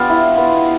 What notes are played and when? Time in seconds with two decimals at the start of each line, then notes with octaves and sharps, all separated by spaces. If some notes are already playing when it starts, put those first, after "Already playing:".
Already playing: B3 D4 F4 G4
0.09 E4
0.37 B3